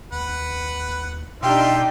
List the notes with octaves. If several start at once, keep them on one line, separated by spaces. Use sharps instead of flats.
D#2 B4 F#5
B2 D4 D#4 F4 G4 E5 G5 C6